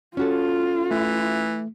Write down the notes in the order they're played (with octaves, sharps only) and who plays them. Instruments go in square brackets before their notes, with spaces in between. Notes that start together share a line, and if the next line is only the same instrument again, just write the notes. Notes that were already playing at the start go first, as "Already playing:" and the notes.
[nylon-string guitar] C#4 F#4 A4 [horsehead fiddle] F4
[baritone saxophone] E3 [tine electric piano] A3